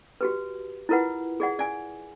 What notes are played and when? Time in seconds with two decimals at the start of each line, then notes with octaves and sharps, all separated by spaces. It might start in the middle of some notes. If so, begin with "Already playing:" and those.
0.21 F#4 G4 B4
0.89 E4 F4 A#4 B4 F#5
1.40 G#4 D5 F#5
1.59 D5 G#5